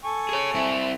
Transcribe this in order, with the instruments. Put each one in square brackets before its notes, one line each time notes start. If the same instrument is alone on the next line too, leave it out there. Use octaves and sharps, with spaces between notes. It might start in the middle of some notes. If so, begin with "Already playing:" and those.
[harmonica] A4 G#5 C#6
[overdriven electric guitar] G#4 C#5
C4 E4